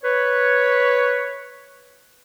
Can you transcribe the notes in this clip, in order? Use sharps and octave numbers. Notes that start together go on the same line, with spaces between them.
B4 C#5